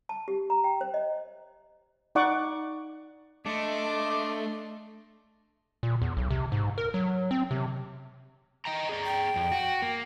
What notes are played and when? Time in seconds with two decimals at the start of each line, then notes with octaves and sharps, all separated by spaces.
0.09 A5
0.28 G4
0.50 A#5
0.64 G5
0.81 C5
0.94 D#5
2.15 D#4 D5 F#5 C#6 D6
3.46 A3 D4 D#5 C6 D6
5.83 A#2
6.02 E2
6.17 B1
6.31 C3
6.52 G#2
6.78 A#4
6.94 F#3
7.31 C4
7.51 C3
8.65 D#5 G5 A#5
8.89 G#4 D5 A#5
9.05 G5
9.36 F2
9.52 F#4
9.82 A#3